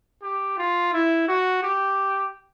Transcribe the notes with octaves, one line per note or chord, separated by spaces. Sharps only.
G4
F4
E4
F#4
G4